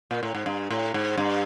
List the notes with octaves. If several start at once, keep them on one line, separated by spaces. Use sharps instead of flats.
A#2
A2
G#2
G2
A2
G#2
G2